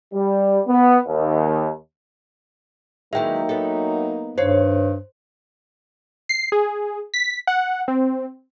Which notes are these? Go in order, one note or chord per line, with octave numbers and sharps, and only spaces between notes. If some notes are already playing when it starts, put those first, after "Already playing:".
G3
B3
D#2
D#3 E3 F#3 G#3 A#3 D#4 E5 G5
B3 A4
G2 D#3 C5 C#5 F5
C7
G#4
B6
F#5
C4